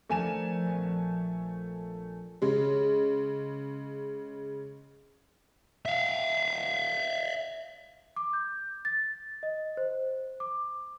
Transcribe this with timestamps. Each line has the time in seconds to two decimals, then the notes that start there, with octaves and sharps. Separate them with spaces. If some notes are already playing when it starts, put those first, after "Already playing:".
0.09 F3 A3 D4 A#4 G#5 E7
0.66 A#1 B3
2.42 C#3 G#3
5.86 E5 F5
8.17 D6
8.33 G6
8.85 A6
9.43 D#5
9.77 C5
10.40 D6